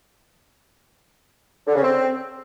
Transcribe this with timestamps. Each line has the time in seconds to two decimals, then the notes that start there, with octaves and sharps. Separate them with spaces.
1.67 D3
1.75 C#3
1.82 C4